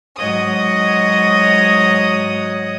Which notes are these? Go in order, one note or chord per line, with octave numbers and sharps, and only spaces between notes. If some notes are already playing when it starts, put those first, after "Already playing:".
G#2 F#3 C#5 D#5 F#5 D#6